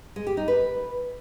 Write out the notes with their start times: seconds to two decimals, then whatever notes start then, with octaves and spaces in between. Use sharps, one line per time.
0.16 G#3
0.27 G4
0.37 D#4
0.48 B4